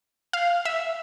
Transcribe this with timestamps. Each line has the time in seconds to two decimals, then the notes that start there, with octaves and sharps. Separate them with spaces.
0.33 F5
0.65 E5